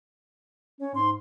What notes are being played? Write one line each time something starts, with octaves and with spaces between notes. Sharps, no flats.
C#4 C#5
G#2 C6